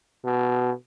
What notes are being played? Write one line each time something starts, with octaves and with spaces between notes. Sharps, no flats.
B2